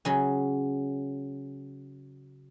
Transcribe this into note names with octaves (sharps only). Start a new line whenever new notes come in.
C#3 F#3 G#5